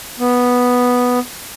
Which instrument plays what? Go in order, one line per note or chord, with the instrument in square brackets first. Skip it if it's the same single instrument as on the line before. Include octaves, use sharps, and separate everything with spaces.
[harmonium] B3